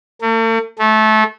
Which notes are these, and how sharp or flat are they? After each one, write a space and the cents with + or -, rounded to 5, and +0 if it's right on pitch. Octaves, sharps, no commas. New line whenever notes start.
A3 +45
A3 -20